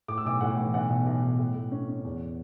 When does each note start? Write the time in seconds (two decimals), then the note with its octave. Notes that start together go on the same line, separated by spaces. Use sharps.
0.08 A2 D6
0.18 E6
0.26 B1 D6
0.41 A2 F#5
0.58 E3
0.74 B1 F#5
0.90 B2
1.07 B1
1.23 B1
1.39 A2
1.55 A2
1.72 C#4
1.88 C#4
2.05 E2